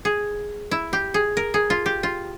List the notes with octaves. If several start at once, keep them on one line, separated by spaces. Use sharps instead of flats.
G#4
E4
G4
G#4
A#4
G#4
F4
G4
F4